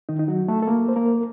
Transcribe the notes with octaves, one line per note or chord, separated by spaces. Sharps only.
D#3 D#4
D#4
F#3 F#4
A3 A4
A4
A#3 A#4
C5
A#3 A#4